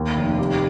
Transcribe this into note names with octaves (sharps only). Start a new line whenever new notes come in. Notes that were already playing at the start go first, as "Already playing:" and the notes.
Already playing: D#2
F1
G4